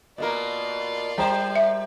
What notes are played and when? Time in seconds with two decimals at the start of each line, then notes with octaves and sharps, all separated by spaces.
0.18 B2 A#3 F4 A#4 D5
1.18 G3 C5 G5 A#5
1.55 E5